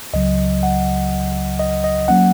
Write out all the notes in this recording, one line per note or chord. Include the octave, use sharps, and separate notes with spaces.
C#2 C#3 F#3 D#5
F#5
D#5
D#5
F#3 A#3 C#4 F#5